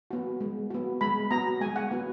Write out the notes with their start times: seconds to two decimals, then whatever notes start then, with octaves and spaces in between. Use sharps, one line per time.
0.11 B3 F#4
0.40 G#3
0.70 B3 F#4
1.01 G#3 B5
1.31 B3 F#4 A#5
1.61 G#3 G#5
1.76 F#5
1.91 B3 F#4